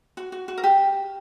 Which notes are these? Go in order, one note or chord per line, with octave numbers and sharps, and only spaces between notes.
F#4
F#4
F#4
A#4
G4